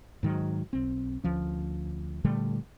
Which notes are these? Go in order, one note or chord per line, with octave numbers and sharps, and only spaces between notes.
G#2 D#3 F#3
B1 C4
D2 F3 C#4
A#2 D3 G3 A3